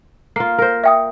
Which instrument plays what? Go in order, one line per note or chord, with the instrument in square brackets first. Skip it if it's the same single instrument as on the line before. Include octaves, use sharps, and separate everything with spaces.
[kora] A#3 F4 [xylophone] C7
[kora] A#4 C5
[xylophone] E5 G5 D#6